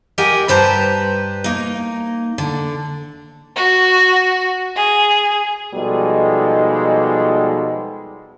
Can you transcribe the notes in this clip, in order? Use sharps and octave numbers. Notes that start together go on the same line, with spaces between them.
G4 A#4 D#5 F#5 G#5
G2 B4 C5 A5 A#5
A#3 D#4
D3
F#4
G#4
B2 F3 G3 G#3 D#4 A4